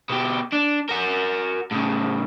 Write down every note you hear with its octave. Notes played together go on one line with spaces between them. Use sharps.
B2 G4
D4
F#4 A#4
A2 C#3